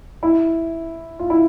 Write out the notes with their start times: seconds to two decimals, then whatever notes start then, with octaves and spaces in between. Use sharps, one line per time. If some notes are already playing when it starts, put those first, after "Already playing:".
0.23 E4
1.19 F4
1.30 E4